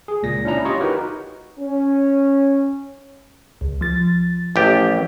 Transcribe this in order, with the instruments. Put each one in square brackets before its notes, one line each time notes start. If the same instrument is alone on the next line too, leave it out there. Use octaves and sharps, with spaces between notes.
[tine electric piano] G#4
C#2 A#2 A#6
C#4 D4 E4 A#5
E4 F4 G4 C#5 D#5 C#6
D#4 F#4 G4 A#4 B4
[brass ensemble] C#4
[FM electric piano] C#2
F3 A6
[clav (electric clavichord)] A1 G4